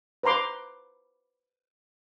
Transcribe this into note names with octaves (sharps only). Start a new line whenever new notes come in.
B4 C5 A#5 C6 D6